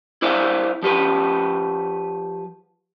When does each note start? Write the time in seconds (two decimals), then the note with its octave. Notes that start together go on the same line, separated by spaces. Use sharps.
0.22 E4 C5 D5 E5 F5
0.83 F3 G4 B4